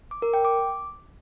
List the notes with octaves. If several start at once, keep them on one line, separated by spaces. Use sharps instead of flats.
D6
A#4
G5
D6